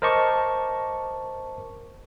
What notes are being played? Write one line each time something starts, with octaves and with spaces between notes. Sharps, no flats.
A#4 C5 D#5 A5 C#6 D6